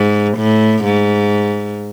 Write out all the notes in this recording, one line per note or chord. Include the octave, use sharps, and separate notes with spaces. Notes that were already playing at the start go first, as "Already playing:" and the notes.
Already playing: G#2
A2
G#2